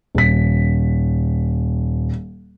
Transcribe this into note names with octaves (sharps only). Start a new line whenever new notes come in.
D#1 B6